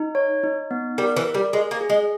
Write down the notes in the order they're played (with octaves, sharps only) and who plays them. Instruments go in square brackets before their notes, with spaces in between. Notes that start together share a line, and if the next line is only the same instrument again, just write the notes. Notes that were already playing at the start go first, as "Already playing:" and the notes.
Already playing: [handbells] D#4
C#5
D#4
B3
[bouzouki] G3 [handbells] A#4
[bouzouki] E3
[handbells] A#4
[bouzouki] G3
[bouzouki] G#3 [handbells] G#4
[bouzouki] A#3
[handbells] G#4
[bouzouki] G#3